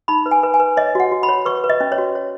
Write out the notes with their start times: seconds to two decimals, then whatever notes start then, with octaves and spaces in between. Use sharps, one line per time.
0.08 D#4 B5
0.26 B4
0.31 G#5
0.43 B4
0.54 G#5
0.60 B4
0.77 C#5 D#5
0.95 F#4 F#5
1.12 F#4
1.23 B5
1.29 C#5
1.46 B4 C#6
1.64 B4
1.70 D#5
1.81 C#4
1.92 C#5
1.98 F#4
2.15 C#5